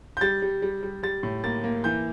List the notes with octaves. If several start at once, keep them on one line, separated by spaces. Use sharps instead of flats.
G6
G3 A6
G3
G3
G3
G3 A6
A2
A#3 A6
A#3
E3 G6